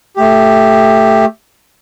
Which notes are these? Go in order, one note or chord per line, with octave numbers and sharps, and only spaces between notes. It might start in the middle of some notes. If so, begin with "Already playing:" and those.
A3 G4